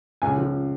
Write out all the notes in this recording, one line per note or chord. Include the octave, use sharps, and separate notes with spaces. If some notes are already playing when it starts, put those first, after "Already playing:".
C#2 G#5
F3